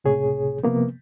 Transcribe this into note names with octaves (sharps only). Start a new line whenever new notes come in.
C#2 A2 C3 G#4 C#5
C3 F3 A#3 B3